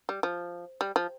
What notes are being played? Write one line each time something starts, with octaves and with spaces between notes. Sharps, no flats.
G3
F3
G3
F3